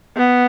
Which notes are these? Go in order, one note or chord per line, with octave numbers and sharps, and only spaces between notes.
B3